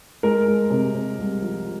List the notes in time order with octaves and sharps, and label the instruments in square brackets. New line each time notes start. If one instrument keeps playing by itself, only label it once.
[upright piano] G#3 A#4
G#3
C3
C3
C2
F3